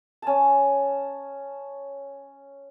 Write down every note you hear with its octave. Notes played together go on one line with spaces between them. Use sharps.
C#4 A5